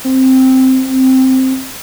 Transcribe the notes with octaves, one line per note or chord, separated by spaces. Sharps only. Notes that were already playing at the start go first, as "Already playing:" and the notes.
C4